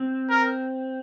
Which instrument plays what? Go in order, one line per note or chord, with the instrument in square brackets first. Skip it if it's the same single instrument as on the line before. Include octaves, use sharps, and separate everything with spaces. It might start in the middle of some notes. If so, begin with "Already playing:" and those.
Already playing: [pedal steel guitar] C4
[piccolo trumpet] A#4